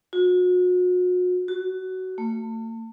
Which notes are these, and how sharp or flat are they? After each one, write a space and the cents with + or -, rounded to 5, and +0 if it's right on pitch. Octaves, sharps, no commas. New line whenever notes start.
F#4 -40
F#4 +15
A3 +35